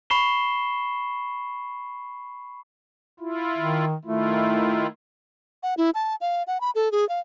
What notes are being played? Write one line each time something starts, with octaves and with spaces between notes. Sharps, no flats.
B5 C#6 C7 E7 G7
E4 F4
D#3
D#3 A3 E4 F4
F#5
E4
A5
F5
F#5
B5
A4
G#4
F5